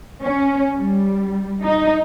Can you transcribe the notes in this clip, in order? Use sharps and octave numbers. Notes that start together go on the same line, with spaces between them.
C#4
G3
D#4